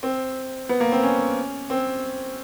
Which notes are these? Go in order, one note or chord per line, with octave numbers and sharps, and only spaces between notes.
C4
B3
A#3
C4
C#4
C4